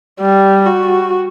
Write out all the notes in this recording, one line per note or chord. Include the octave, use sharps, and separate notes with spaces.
G3
F#4